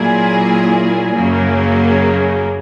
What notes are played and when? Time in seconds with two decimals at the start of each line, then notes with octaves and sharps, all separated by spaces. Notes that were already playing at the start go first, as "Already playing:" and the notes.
Already playing: A#2 F#3 A#3 E4 G#4
1.15 F#2 C#3 F#3 A#3